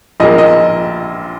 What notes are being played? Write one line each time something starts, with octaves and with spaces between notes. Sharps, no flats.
A#1 A#2 A#3 D#5
D#5